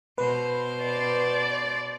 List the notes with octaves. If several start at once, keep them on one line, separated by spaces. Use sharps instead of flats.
B2 B4 C5
D5